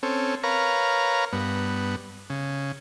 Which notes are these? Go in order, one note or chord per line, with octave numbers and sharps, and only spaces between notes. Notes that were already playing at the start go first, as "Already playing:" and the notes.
C4 C#4 A4
A#4 B4 C#5 F5 A#5
G2 B3
C#3